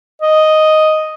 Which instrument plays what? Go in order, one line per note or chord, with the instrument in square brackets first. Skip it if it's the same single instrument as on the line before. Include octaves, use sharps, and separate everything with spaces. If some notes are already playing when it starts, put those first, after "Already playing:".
[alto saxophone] D#5